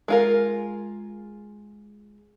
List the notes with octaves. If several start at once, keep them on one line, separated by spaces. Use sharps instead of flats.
G#3 F4 A#4